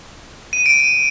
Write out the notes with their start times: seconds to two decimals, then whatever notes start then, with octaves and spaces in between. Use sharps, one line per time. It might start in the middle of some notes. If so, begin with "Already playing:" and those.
0.53 D#7
0.66 D7
0.80 D#7